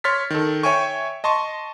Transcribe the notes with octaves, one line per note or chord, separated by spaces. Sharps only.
C#5 C6 F6 A6 B6
D#3 A4
C#5 E5 G5 G#5 C#6
D#5 A5 C6 C#6